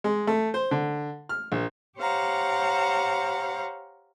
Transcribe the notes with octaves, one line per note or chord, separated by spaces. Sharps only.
G#3
A3
C5
D3
F6
A#1
G4 C5 C#5 F5 F#5 A#5